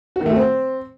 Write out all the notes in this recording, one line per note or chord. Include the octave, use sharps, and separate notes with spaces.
F#4
D#3
A3
F#4
C4